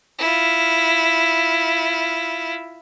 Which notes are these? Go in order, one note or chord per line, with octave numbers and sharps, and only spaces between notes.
E4 F4